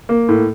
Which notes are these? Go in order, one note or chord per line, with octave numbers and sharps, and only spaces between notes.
A#3
A2